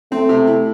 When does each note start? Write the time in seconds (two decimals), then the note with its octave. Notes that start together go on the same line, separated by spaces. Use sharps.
0.12 A3 C4
0.29 C3
0.47 E4